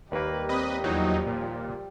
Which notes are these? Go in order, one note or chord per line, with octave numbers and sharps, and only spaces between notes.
D#2 G3 A#3 B4
C4 B4 D#5
E2 F3 F#3 D#4
A#2